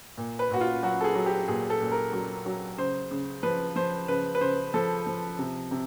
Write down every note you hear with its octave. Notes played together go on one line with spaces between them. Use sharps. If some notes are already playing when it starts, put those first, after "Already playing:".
A#2
B4
A#2 F#4
F4
F#3 F#4
A4
G#4
F#3
G4
A#2 G#4
A4
A#2
A#4
F#3
F#3
C#3 C5
C#3
F3 B4
F3 C5
C#3 B4
B4
C#3 C5
F3 A4
F3
C3
C3